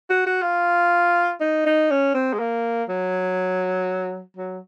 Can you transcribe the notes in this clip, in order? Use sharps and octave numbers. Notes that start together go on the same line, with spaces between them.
F#4
F#4
F4
D#4
D#4
C#4
C4
G#3
A#3
F#3
F#3